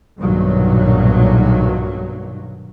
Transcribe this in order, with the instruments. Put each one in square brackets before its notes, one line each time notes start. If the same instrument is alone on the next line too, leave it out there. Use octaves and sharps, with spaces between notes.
[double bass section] B1 G2 A#2 D#3 F#3